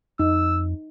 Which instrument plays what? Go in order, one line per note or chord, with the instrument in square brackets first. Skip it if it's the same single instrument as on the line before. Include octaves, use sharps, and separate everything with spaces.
[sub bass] F2 [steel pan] D#4 [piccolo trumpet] E6